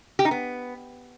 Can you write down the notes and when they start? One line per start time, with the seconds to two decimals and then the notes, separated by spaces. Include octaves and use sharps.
0.19 G4
0.25 D#4
0.31 B3